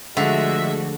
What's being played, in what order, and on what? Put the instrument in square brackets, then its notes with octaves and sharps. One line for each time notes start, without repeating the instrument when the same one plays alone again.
[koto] D3 [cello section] F3 A3 F#4 [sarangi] G#3 [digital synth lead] E5